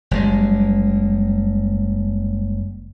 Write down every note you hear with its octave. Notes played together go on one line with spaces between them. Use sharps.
F#1 G3 G#3